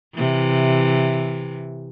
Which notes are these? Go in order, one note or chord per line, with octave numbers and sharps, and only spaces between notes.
C3 E3